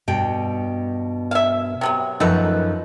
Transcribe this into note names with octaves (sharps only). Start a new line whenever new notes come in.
G2 B2 G5
E5 F5
C3 F#3 B3
F#2 F3 A3 D#4 F#4 B4